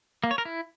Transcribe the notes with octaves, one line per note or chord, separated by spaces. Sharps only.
A#3
C#5
A#4
E4